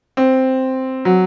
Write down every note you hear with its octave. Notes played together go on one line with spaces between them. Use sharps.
C4
F#3